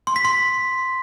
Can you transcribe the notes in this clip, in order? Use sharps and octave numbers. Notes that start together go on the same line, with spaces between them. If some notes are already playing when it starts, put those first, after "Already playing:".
C6
B6
C6